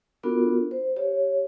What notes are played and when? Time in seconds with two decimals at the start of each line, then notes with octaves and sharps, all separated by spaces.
0.23 B3 D4 F4 F#4 A4 A#4
0.71 C5
0.96 G4 C#5